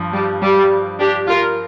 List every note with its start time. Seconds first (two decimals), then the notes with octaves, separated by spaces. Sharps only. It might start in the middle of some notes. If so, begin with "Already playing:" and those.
Already playing: G2 F3
0.13 G3
0.42 G3
0.99 D4 G4
1.28 F4 A#4